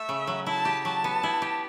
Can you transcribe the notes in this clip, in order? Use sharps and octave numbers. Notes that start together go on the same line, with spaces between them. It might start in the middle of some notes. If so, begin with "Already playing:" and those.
Already playing: A3 E5
C#3
F#3
E4 A5
G4
F#3 A5
B3
E4
G4